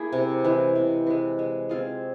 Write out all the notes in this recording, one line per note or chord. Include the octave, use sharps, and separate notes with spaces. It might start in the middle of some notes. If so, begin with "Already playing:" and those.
Already playing: A#3 E4 G#4
C3
E3 G#3
C3
E3 G#3
G#3
C4 F4 G#4